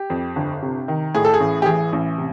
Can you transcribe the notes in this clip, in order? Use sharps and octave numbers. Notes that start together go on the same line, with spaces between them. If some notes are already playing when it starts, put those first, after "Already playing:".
Already playing: G4
F2
G1
C3
D#3
A2 G#4
A4
G#4
A1
G4
E3 G#4
A1
C3